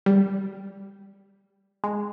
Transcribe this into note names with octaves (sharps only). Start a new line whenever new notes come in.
G3
G#3